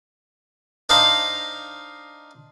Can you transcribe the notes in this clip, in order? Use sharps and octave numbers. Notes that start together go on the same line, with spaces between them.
D4 D#4 C5 F5 A#5 C6